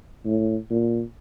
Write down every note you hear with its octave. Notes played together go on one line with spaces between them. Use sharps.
A2
A#2